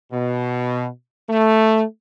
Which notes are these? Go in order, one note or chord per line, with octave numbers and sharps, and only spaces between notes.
B2
A3